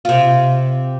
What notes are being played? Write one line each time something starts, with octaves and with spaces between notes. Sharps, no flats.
C3 F4